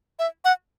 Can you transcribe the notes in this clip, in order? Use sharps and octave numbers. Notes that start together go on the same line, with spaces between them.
E5
F#5